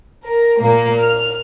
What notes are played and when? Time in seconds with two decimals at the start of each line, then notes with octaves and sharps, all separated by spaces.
0.25 A#4
0.60 A#2 A#3
1.02 F6